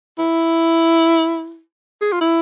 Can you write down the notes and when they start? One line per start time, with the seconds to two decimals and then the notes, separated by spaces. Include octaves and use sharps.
0.19 E4
2.02 G#4
2.12 F4
2.21 E4